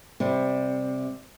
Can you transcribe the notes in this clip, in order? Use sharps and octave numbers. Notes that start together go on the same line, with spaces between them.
C3 G3